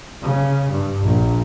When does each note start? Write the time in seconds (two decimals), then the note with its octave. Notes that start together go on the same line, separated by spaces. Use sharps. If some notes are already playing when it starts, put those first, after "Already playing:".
0.22 C#3
0.70 G2
1.04 A#1